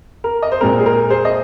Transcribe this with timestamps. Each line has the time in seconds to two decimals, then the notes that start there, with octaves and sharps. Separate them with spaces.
0.24 A#4
0.43 D#5
0.52 C5
0.61 A#2 G#3 C4 A#4
0.80 G#4
0.86 A#4
1.10 G#4 C5
1.25 D#5